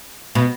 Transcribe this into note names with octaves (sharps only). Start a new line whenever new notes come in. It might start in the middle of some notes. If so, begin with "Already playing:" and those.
B2